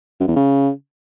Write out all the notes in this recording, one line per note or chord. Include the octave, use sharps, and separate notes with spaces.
F#2
E2
C#3